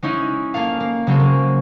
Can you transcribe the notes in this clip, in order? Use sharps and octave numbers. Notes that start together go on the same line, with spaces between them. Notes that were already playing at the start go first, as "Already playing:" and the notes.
G#3 C#4 D#4 E4
A#3 G#4 A4 F5
A#3
C#3 F#3 G#3 C4 C#4 A4
A#3